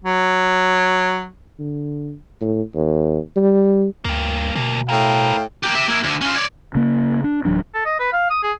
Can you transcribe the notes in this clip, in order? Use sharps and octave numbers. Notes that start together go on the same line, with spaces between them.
F#3
D3
A2
D#2
G3
D2 G2 A#3
D2 B2 A#3
A2 E4 A#4 F5 G5
A#3 G4
G4 E5
A#3 E4
D2 D3
C#4 F4
C#5 D5
C#3 A#3
D4
D1 E3 F#3 D4
A4
D#5
B4
F5
D#6
G#4